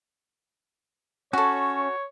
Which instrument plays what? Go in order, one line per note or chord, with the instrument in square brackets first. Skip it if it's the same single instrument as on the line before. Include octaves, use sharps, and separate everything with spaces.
[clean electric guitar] C#4 [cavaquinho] F#4 A4 [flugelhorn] C#5 [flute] C#6